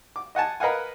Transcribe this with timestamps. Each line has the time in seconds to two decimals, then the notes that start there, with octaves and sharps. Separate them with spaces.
0.16 D6
0.35 D#5 F#5 G#5 A5
0.60 A#4 B4 D#5 F5 F#5 G#5